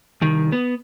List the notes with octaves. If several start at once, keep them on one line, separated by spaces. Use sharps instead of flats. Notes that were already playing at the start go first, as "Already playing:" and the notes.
C2 D#3
B3